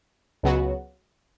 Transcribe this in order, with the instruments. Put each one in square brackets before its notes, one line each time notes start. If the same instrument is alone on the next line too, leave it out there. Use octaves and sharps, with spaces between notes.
[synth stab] C#2 C#3 F#3 B3 F#4